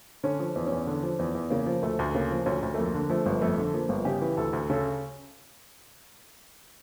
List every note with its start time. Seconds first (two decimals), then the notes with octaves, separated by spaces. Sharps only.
0.24 D3 C#4
0.40 F3
0.56 E2
0.66 C#4
0.72 E2
0.87 D3
1.03 F3
1.19 E2
1.35 E2
1.50 C#3 A#3
1.67 F3
1.83 D2 A3
1.99 D2
2.15 C#3 A#3
2.31 F3
2.46 D2 C#4
2.63 D2
2.74 A3
2.78 F2 A#3
2.94 D3
3.10 F3 A3
3.26 G1
3.42 F2 A3
3.58 D3
3.74 F3 A#3
3.89 G1
4.05 C#3 G4
4.21 E3
4.37 D2 A4
4.53 D2
4.70 C#3 A4